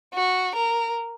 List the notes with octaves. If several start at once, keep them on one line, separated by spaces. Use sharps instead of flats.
F#4
A#4